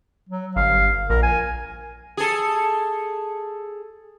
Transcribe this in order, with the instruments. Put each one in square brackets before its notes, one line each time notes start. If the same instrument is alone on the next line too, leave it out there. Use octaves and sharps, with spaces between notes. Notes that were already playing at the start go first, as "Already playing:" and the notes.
[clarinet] F#3
[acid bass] G1 [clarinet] F5
[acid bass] A#1 [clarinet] A#4
[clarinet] G#5
[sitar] G#4 A4